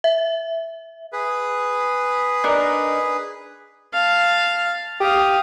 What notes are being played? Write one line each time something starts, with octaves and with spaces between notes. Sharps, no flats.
E5
G#4 B4
D4 D#4 A#4
F5 A5
G4 F5 D#6